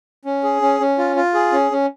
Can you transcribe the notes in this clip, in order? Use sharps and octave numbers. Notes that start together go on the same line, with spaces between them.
C#4
G#4
C#4
C#4
F4
F4
G#4
C#4
C#4